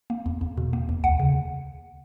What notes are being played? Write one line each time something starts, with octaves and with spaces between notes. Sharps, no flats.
A#3
E2
E2
B2
A#3
E2
D2 F#5
C#3